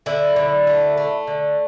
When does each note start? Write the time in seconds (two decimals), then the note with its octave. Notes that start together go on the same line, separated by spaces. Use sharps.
0.06 D3 E4
0.36 D3
0.67 A3
0.97 A3
1.27 D3